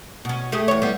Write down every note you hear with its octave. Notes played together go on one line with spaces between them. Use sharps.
B2 C#4
A3 G4 G#4
E2 C#5
G3 B3